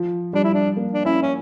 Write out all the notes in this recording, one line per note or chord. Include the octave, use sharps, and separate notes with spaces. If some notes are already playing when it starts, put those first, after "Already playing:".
Already playing: F3
G3 D4
E4
D4
A#3
D4
C#4 E4
C#4